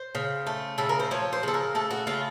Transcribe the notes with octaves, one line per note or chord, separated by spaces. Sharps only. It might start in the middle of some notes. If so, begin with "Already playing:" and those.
Already playing: C5
C#3
A3
C#3 A4
A#4
C5
F3 C#5
C5
C#3 A4
A#4
A3 A4
F#4
C#3 F4